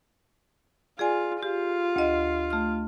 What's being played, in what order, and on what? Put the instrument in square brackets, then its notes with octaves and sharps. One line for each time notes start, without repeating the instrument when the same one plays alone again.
[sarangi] F4 [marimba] G#4 D5 G#5
[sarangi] F4 [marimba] G4
[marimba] D2 D#5
A3 F6